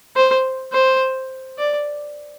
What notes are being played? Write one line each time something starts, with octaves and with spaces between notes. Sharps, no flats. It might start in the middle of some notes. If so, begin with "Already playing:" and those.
C5
C5
D5